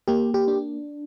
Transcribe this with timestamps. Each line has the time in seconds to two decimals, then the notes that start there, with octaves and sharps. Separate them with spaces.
0.08 A#3 G4
0.34 G4
0.48 D4